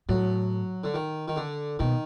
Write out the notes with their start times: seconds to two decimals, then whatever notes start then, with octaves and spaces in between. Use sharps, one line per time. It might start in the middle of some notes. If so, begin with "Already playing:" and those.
0.09 A2 F#3
0.84 D3
0.94 D#3
1.28 D#3
1.36 D3
1.79 B2 D#3